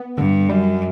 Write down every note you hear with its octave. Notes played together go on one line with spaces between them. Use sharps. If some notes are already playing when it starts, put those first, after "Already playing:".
Already playing: B3
G2 D3
F#2 G3